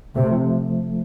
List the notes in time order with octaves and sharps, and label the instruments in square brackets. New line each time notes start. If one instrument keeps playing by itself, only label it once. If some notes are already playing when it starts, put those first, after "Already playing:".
[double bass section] C3 [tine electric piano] A3
[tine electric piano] F3